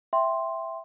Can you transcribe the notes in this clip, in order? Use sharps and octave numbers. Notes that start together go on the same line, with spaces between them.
E5 G5 C6